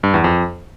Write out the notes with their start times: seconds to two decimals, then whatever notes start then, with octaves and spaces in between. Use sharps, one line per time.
0.03 G2
0.14 E2
0.24 F2